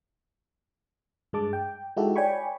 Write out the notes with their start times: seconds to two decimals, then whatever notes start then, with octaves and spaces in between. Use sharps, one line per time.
1.33 G2 G#3 A5 D6
1.53 G5
1.97 G#3 D#4 E4 F#4 G4 A4
2.16 C#5 D5 G5 G#5 B5 C#6